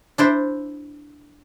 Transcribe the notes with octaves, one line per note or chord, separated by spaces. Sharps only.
D4 E4 C5